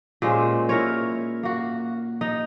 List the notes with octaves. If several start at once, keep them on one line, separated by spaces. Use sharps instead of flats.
A#2 G#3 C#4 C5
E4 A#4 C#5
A#3 F#4
D#4